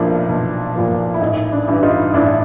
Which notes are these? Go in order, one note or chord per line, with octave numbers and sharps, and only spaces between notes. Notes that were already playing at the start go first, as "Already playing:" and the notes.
Already playing: B1 A#2 F3 D4 E4
B1
A#2 F3
E4
A1 D#4
D4 E4
G2 E3
D#4 F4
A1 D4 E4